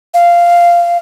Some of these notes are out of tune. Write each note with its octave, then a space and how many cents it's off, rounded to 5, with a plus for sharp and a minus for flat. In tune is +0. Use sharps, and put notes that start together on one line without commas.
F5 -10